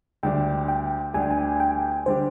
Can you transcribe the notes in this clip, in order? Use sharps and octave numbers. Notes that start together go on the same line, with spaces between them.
D2 D3 G3 D4 G4 G5
G5
D2 D3 G3 D4 G4 G#5
G5
G#5
G5
D3 G3 D4 G4 C5